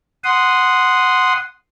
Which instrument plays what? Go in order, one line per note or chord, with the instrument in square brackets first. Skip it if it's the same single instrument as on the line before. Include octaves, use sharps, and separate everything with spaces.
[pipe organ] F#5 C6 D#6